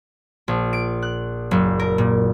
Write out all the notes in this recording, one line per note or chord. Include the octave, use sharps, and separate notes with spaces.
A#1
D7
F#6
F#1
A#4
A#2